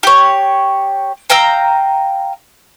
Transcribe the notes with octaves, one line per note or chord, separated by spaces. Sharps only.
G4 C#5
F5 G5 A#5 E6